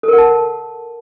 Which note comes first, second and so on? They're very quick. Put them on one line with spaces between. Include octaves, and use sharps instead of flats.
A4 A#4 F#5 A5